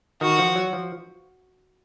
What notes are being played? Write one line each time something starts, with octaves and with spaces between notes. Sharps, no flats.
D#3 F#4
F3
F#3
F3